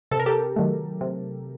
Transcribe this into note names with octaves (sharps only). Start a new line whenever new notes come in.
C3 A4
A#4
G4 A4
D#3 F#3 A3
C3